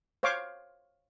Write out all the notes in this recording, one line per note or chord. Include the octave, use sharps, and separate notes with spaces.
C5 C#5 F5 C#6 D6